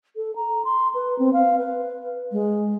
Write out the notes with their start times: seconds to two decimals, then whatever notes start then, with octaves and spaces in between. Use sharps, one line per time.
0.16 A4
0.36 A#5
0.65 C6
0.94 B4
1.19 C4
1.33 F5
1.59 B4
2.32 G#3